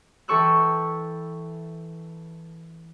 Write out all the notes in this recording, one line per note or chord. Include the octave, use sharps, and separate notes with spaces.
E3 A4 G5 C#6 E6 F#6